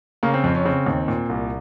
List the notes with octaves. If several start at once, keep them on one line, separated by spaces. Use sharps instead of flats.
C#3 A#3
C4
F2 C4
C#4
C#3 C4
D#2
A#2
C2